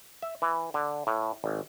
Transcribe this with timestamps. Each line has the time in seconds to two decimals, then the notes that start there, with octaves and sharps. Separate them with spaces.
0.22 E5
0.42 E3
0.74 D3
1.07 A2
1.44 G#1